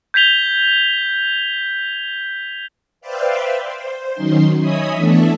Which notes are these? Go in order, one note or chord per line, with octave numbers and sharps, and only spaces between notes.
G6 G#6 B6 F7 G7
B4 C5 D5 E5 F5 G5
C5
D#3 F#3 C#4 D#4 C6
C#5 D#5 E5 G#5 B5 D#6
E3 A3 B3 D4 A4 E5